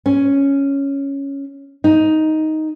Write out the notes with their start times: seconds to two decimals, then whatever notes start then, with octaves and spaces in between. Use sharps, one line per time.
0.06 C#4
1.84 D#4